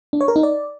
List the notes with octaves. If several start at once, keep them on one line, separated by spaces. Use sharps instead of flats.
D4
C#5
A#4
D#4
D5